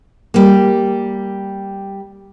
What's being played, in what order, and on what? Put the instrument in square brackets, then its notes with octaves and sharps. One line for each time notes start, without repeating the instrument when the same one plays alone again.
[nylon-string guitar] G3 A#3